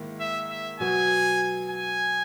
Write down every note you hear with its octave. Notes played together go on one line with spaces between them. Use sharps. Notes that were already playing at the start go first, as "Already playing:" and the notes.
Already playing: G#2 D#3 A#3 E4
E5
E5
B2 F#3 B3 G#5
G#5